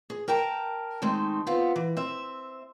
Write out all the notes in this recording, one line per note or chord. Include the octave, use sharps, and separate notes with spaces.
G#4
A#4 G5 A5 A#5
D#3 G#3 A3 C4 D#4
B3 C4 F4
E3
C4 E5